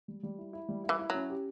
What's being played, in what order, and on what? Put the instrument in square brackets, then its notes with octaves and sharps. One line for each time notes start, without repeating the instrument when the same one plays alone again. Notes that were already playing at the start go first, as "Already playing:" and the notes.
[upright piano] G3
G3
E4
E4
G3
E4
[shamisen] E3
[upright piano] E4
[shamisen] F#3 [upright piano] C#4
[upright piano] G4